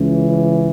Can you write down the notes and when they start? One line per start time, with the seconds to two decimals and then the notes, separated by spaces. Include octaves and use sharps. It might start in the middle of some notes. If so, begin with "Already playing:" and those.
Already playing: C#2 C#3 E3